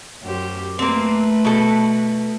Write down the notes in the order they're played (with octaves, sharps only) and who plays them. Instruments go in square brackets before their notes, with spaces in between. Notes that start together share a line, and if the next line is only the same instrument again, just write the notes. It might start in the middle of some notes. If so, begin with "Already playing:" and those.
[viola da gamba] F#2 G4 C5
[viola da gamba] A3 B4 [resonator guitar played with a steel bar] A#3 C4
[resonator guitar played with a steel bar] B2 A4